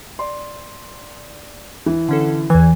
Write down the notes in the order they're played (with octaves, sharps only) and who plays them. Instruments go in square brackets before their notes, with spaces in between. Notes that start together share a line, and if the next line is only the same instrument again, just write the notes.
[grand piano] D5 C6
E3
[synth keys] D3 C#4 A4
[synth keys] E2 G#6 [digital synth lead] E3